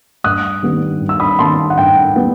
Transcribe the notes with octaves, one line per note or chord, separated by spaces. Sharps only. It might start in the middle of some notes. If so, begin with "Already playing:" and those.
G2 D#6 F#6
D#3 G3 B3
G2
E6
B5 D#6
D#3 G3 B3 A5 C6
F#5
G2 G5
G3 B3